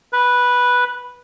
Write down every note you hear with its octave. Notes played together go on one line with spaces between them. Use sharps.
B4